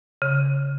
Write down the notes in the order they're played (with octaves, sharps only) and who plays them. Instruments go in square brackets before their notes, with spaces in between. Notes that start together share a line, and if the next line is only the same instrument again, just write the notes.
[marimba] C#3